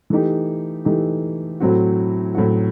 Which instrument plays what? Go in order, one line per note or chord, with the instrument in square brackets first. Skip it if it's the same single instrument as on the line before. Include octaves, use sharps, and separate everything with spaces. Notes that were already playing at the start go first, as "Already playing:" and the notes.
[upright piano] E3 A3 D#4 G4
E3 A3 D#4 G4
A2 F#3 C4 F#4
A2 F#3 C4 F#4